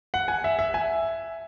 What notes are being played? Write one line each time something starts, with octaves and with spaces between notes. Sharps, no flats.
F#5
G#5
E5
E5
G#5